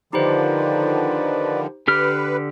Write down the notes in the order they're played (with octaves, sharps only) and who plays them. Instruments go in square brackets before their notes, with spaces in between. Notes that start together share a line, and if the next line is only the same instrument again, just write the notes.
[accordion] D3 D#3 F3 [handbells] D#4 G4 C5 [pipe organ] B4 D5
[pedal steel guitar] D3 G4 F6 [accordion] B4